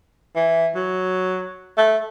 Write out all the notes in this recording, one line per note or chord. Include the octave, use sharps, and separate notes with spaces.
E3
F#3
A3